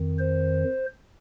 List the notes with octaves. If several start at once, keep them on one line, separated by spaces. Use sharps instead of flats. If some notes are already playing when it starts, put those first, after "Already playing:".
Already playing: F2 D#3
C5